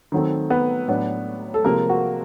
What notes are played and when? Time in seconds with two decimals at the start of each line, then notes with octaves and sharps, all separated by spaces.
0.12 D#3 F#3 A3 C4
0.50 B3 B4
0.88 A2 F#3 B3 D4
1.54 A4
1.64 C3 F3 G#3 A#3 C4 A#4
1.89 F#4